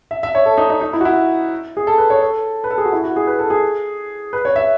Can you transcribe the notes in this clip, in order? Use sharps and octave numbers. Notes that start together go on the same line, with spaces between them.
E5
E5
C#5
A4
D#4
D#4
D#4
E4
F#4
E4
G#4
A4
B4
C#5
A4
B4
A4
G#4
F#4
E4
F#4
G#4
B4
A4
G#4
B4
C#5
E5